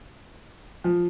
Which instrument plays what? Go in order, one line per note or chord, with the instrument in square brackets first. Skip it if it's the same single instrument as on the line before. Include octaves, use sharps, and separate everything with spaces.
[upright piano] F3